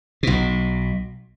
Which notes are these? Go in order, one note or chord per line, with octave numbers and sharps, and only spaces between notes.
B1 B2